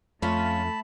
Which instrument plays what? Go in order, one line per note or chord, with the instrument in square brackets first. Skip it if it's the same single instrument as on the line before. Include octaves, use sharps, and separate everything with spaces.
[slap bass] F2 [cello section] A3 [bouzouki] C#4 F4 [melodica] A5 B5